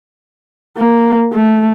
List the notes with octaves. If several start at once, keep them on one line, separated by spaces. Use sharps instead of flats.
A#3
A3